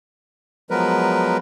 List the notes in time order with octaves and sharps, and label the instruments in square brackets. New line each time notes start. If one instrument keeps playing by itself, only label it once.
[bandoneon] F3 F#3 G#3 B3 A#4 B4